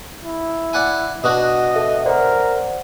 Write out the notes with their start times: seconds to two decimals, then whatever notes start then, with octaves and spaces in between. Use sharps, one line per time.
0.23 E4
0.73 D5 F#5 G#5
1.24 B2 D4 F#4 D#5 D#6
1.74 A4 E5
2.06 A#4 C5 D5 F#5